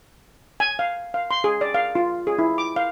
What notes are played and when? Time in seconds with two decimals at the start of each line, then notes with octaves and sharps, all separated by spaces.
0.60 G#5
0.79 F5
1.14 F5
1.31 C6
1.44 G#4
1.61 D5
1.74 F5
1.95 F4
2.27 G#4
2.39 E4
2.58 D6
2.76 F5